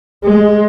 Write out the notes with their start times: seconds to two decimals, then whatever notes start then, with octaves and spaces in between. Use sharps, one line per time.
0.24 G#3